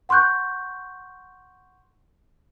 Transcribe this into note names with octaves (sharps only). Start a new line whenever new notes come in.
F#5 C6 C#6 F#6 G6